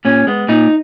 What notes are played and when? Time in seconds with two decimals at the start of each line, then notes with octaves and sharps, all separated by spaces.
0.05 A#2 C#4
0.27 G#3 B3
0.48 A#2 D#4